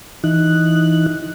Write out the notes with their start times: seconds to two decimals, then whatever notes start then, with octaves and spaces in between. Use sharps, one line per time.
0.24 E3 D#4 F#6